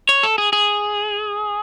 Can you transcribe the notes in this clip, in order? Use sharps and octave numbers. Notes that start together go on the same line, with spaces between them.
C#5
A4
G#4
G#4